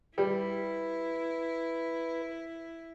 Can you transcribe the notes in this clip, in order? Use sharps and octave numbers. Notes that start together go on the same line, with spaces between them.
G3 E4 B4